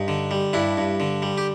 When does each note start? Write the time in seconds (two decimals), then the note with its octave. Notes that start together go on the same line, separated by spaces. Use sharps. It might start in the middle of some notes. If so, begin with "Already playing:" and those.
Already playing: G2 D#4
0.08 D3
0.31 G3
0.53 G2 D4 E4
0.77 G2
1.00 D3
1.22 G3
1.38 G4